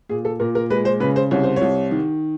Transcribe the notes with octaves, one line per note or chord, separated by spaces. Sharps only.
A#2 G#4
A4
A#2 A#4
A#4
G#3 B4
C5
C#3 B4
C5
C2 C#5
C5
C2 C#5
D#3